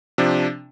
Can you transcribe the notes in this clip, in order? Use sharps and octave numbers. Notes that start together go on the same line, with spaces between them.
C3 F3 D4